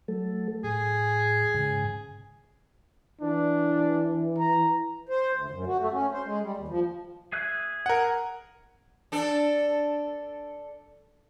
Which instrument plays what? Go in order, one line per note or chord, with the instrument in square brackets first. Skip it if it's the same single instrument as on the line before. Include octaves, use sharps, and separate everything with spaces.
[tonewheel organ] F#3 A3 A4
[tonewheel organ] A2 [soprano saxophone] G#4
[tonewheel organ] G#2 C#3 G#5
[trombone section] E3 [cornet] D4
[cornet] A#5
[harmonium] C5
D2
F#2
F#4
A3
C#4
C5
G#3
G3
D#2
F3
[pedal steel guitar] G#4 E5 F#6
[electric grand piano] A#4 F#5
[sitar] D4 A4